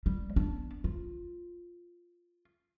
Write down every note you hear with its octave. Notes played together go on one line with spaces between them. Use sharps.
G3
B3 D4
F4